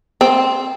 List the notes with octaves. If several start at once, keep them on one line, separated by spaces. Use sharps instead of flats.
C4